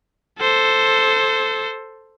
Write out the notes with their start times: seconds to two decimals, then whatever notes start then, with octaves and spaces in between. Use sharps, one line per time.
0.39 A4 C5